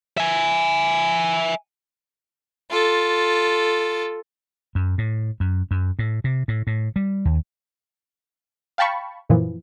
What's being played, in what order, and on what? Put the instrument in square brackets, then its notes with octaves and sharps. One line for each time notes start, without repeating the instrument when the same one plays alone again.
[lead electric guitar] E5 G#5
[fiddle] F4 A4
[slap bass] F#2
A2
F#2
F#2
A2
C3
A2
A2
G3
D#2
[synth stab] F5 G5 A5 B5 C#6
F#2 A#2 E3 F3